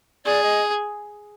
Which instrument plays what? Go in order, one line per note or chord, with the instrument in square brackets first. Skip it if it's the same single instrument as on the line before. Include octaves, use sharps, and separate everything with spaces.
[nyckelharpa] G#4 [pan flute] D5
[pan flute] D#5